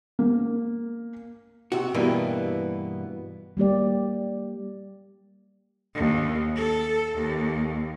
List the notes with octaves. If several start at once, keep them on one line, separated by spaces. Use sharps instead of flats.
A#3
C3 F#4
G2 B2 E3 A#3 B3
G3 A#3 G4 D5
D#2
A4
D#2